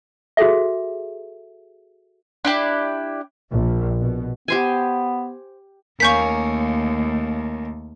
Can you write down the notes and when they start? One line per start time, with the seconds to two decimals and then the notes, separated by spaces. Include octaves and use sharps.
0.37 F#4 G#4 A4 E5
2.45 D4 E4 G4
3.51 A#1
3.99 B2
4.48 B3 G4 C5 G#5
6.00 D#2 A3 A#3 C#4 F5 C#6 G6 B6